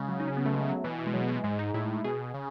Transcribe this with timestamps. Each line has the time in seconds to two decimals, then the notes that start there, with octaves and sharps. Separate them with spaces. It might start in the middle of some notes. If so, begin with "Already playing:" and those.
Already playing: C#3 G#3
0.09 F#3
0.20 D#4
0.28 C#4
0.37 B3
0.46 A3
0.54 G#3
0.69 F#3
0.84 B2 E3
0.99 E3
1.07 G#3
1.14 F#3
1.28 G#3
1.44 G#2 G#3
1.59 D#4
1.74 A2 E4
2.04 B2 G#4
2.34 C#3